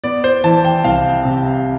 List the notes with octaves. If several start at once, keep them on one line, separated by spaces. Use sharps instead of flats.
B3 D5
C5
E3 A5
G5
C2 F5
C3